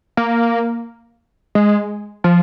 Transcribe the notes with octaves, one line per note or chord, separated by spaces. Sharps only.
A#3
G#3
F3